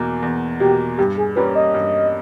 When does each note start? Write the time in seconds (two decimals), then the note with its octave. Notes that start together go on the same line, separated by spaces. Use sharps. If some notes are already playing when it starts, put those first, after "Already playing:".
Already playing: E2 B2 A#3
0.22 E2
0.60 B2 A#3 G4
0.98 G2 G4
1.18 G#4
1.36 G3 A#3 C#4 B4
1.55 D#5
1.74 G2